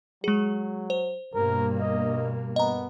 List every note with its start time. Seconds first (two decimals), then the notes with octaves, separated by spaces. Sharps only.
0.24 F#3 G#3 G#4
0.90 C5
1.35 G2 B2 A#3 A#4
1.80 D#5
2.56 B3 D#5 A#5